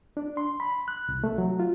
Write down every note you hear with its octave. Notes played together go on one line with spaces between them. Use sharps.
D4
C6
B5
F#6
C2
A3
F#3
F4